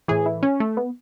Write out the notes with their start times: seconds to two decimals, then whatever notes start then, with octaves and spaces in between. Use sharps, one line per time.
0.08 A2 E3 G#4
0.26 E4
0.43 C#4
0.60 A3
0.77 B3